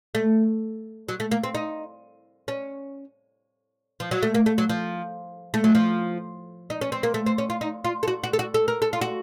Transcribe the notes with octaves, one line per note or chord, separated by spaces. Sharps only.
A3
F#3
A3
A#3
C4
D#4
C#4
F3
F#3
A3
A#3
A3
F#3
F3
A3
F#3
F3
D#4
C#4
C4
A#3
A3
C4
C#4
F4
D#4
F4
A4
F#4
F#4
A4
F#4
A4
A#4
A4
F4
F#4